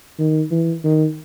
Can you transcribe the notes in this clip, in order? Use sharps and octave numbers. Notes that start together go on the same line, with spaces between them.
D#3
E3
D#3